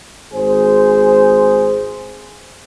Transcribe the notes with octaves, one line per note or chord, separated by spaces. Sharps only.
G#1 G#4 C5